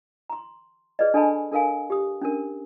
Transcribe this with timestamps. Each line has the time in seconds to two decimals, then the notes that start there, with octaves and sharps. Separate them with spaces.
0.30 A#5 C6
0.99 G#4 B4 D5 D#5
1.14 D4 A4 D#5 G#5 A5 B5
1.51 D4 A4 A#4 F5 G#5
1.90 G4 D#6
2.22 C#4 D4 A#4